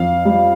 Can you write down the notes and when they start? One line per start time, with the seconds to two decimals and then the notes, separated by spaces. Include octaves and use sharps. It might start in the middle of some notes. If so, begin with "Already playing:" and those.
Already playing: F2 F5
0.25 G3